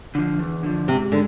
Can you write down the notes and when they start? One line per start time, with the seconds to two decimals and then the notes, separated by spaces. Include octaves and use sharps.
0.15 D3 F3
0.39 E2
0.63 D3 F3
0.88 G#2 C3
1.12 D3 G#3